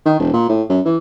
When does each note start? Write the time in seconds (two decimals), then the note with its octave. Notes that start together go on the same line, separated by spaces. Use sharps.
0.05 D#3
0.19 E1
0.33 A#2
0.49 A2
0.70 F#2
0.85 E3